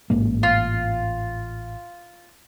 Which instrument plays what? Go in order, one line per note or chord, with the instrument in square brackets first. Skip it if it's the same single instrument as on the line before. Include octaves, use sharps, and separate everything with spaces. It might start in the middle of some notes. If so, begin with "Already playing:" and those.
[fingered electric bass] A1 G#2 A#3
[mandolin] F4